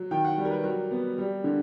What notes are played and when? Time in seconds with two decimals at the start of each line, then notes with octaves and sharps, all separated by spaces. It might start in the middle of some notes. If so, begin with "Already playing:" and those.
Already playing: F#3
0.11 D#3 G5
0.25 F#5
0.38 G3
0.45 A#4
0.51 B4
0.64 F#3 A#4
0.91 B3
1.18 G3
1.44 D3